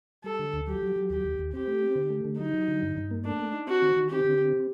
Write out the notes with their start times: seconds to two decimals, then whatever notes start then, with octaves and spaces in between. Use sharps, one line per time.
0.24 G3 A4
0.39 D3
0.53 D2
0.67 F#3 G4
0.82 F#3
0.96 F#3
1.10 D#2 G4
1.24 D#2
1.39 D#2
1.53 C4 G4
1.67 A3
1.82 C4
1.96 D3
2.10 A3
2.25 D3
2.38 F#3 D#4
2.53 F#3
2.68 D3
2.82 G2
2.97 G2
3.11 A#3
3.25 A3 D4
3.39 A3
3.53 D#4
3.67 C4 F#4
3.82 D#3
3.96 D#3
4.10 C4 G4
4.24 D3
4.39 C4